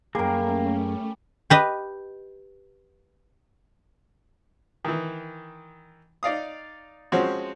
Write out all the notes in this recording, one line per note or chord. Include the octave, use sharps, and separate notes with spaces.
F#2 G3 A3 A#3 C#4 G#4 A#4
G4 B4 D#5
D#3 E3
D#4 D5 F5 D#6
F3 G#3 C4 C#4 F#4